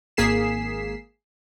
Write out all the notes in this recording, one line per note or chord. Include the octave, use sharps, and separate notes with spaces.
G#1 A#3 G#4 B6 C7 E7